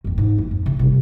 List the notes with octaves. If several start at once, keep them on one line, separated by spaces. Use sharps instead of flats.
F2 D#3
G#2
E4
F2
C#3
C3 G3